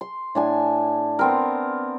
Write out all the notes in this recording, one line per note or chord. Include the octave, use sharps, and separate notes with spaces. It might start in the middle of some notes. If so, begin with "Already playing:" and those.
C6
A2 D4 G#5
B3 C4 A#4